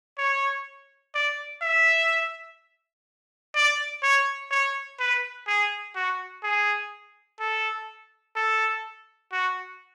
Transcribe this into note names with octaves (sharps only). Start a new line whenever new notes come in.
C#5
D5
E5
D5
C#5
C#5
B4
G#4
F#4
G#4
A4
A4
F#4